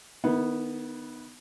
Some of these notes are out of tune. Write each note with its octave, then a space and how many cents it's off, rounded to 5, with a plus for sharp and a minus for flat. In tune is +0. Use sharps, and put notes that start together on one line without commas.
D#3 -20 B3 +0 E4 -40